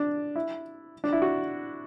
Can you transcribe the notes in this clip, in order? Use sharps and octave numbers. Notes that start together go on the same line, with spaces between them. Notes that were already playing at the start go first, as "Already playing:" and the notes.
Already playing: D4
E4
D4
E4
F#4